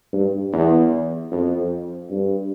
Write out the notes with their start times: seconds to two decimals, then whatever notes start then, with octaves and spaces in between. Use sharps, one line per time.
0.13 G2
0.53 E2
1.31 F2
2.11 G2